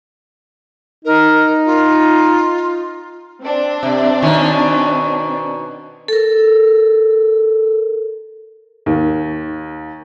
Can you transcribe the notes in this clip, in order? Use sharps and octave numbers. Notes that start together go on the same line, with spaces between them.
D#4 A#4
F4
C4 D4
C3
B2 D#3 C#4
A4 A#4
D#2